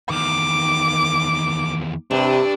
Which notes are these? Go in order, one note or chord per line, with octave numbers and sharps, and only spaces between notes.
E2 D#3 D6
G2 C3 D4